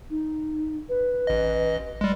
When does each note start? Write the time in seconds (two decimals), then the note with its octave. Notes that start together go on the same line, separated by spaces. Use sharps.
0.10 D#4
0.89 B4
1.27 A1 D#5
2.01 G3 G#3